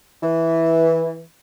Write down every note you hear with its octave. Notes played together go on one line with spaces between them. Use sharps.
E3